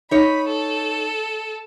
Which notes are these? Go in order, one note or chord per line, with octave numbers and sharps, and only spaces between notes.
D#4 C#5 B5
A4